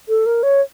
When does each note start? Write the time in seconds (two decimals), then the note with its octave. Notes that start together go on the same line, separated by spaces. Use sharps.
0.09 A4
0.26 A#4
0.43 C#5